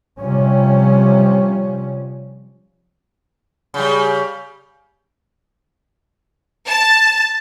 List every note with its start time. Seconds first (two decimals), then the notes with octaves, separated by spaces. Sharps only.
0.21 C3 F3 G3 C#4
3.74 C#3 G3
6.68 A5